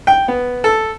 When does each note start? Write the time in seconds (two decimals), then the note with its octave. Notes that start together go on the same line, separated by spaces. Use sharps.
0.07 G5
0.28 B3
0.64 A4